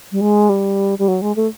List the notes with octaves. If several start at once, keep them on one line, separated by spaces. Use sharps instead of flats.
G3
G#3
G3
G3
F#3
G#3
A3